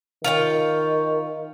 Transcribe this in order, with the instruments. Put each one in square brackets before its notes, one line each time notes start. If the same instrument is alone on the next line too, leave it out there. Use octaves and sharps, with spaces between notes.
[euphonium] D#3 [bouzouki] F4 C#5 G5